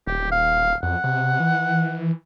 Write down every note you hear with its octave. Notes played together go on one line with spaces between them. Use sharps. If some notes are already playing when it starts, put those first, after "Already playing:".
D#1 G4
F5
F2 F#5
C3
E3